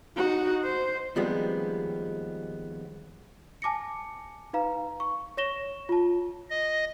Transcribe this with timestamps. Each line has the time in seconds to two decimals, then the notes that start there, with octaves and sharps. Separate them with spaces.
0.16 D#4 F#4
0.64 C5
1.16 D#2 F3 G3 G#3 B3 C4
3.62 G#5 A5 D6 A#6 C#7
4.53 D#4 B4 F5 A#5
5.00 C#6
5.37 C#5 C#6 A#6 E7 G7
5.89 F4 A5
6.50 D#5